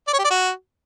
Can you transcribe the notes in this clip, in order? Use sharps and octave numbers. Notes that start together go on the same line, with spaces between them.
D5
C#5
G4
D5
F#4